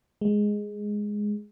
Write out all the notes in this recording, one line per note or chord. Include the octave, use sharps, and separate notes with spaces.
G#3